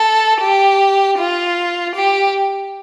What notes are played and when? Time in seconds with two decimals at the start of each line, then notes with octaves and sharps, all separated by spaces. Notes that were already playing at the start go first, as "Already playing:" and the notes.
Already playing: A4
0.41 G4
1.18 F4
1.95 G4